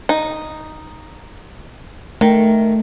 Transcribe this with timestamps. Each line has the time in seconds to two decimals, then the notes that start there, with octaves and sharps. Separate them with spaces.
0.09 D#4
2.21 D#3 A3